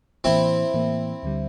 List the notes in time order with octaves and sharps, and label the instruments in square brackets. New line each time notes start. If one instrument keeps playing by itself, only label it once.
[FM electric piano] A2 E3 A#3 [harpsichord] C4 E4
[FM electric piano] A2 E3 A#3
D2 D3 G3